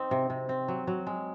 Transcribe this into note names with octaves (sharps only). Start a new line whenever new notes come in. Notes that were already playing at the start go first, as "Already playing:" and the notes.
Already playing: C4 D#4
C3
C3
C4
F#3
F#3
G#3